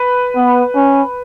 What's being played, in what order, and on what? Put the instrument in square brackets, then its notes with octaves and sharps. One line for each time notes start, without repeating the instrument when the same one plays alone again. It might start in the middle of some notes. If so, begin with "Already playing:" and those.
Already playing: [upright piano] B4
[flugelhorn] B3
C#4